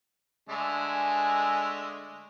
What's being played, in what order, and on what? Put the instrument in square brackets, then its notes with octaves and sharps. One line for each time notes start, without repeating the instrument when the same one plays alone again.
[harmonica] D3 G#3 A3 [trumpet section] G#5